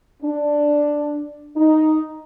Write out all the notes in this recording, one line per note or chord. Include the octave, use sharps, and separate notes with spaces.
D4
D#4